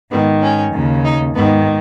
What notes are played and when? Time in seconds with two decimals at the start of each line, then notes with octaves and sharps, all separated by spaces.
0.11 G#2 D#3 B3
0.42 C#4
0.73 D#2 C#3
1.05 D#4
1.35 G#2 D#3 B3